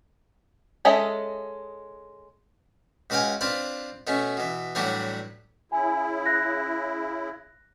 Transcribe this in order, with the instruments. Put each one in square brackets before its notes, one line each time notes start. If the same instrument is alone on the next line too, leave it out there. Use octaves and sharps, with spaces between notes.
[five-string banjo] G#3 C#4 A4 D#5 E5
[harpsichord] C#2 F#4 B4 F5 G5 G#5
C4 D4 F4 B4 B5
B2 A3 C#4
B2 E3
A2 E3 F#3 G3 D4 F#4
[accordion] C#3 E4 [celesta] G#5
[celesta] F#6 A#6